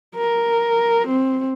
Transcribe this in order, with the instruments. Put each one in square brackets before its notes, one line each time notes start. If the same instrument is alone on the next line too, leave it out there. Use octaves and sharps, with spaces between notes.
[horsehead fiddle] A#4
C4